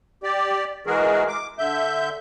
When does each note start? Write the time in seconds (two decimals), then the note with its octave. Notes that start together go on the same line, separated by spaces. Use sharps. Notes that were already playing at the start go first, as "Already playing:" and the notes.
0.23 G4 D5
0.87 E3 G#3 F#4 G#4 A#4
1.28 D6
1.59 D3 E5 G6